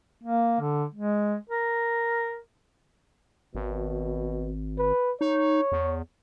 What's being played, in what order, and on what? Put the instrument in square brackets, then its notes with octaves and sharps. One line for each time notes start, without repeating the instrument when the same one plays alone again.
[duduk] A#3
D3
G#3
A#4
[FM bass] G#1 [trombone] B2
[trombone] B4
[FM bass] D#4 [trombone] C#5
[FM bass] E2